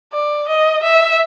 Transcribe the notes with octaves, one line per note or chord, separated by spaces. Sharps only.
D5
D#5
E5